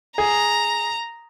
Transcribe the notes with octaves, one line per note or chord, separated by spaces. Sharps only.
G#4 A#5